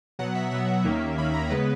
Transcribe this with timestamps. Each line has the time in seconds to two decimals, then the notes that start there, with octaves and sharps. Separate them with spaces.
0.19 B2 F#3 B3 F#5
0.35 E5
0.51 B2 F#3 B3 E5
0.84 D#2 D#3 A#3 C#4
1.17 D#2 D#3 A#3 C#4 B5
1.34 A#5
1.50 C#3 G#3 B3 B4